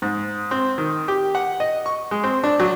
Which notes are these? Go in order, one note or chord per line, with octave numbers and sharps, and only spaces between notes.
G#2
C4
D#3
G4
F#5
D#5
C#6
G#3
C4
D4
F#3